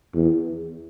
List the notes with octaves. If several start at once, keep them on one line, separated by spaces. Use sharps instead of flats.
E2